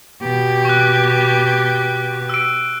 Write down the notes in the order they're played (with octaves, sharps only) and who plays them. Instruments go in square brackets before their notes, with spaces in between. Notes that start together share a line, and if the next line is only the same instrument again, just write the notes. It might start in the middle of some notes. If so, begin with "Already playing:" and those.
[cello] B2 G4
[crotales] C#6 F#6
E6 D7